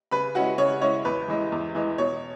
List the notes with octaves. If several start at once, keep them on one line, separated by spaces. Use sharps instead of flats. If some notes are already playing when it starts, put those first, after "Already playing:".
C#3 B4 B5
G#3 C#4 E4 F#4 F#5
C#3 C#5
G#3 C#4 E4 C#5
E2 B4
E3 G#3 E4
E2
E3 G#3 E4
B2 C#5